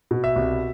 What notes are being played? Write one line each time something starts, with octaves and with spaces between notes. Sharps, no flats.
B2
E5
C2